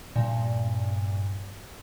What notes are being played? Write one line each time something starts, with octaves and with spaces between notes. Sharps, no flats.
G2 A#2